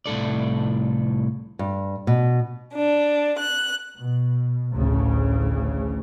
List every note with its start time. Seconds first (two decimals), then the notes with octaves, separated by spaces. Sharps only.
0.06 C2 A2 A4 D5
1.59 G2
2.07 B2
2.75 D4
3.38 F#6
3.98 B2
4.72 A1 D2 C#3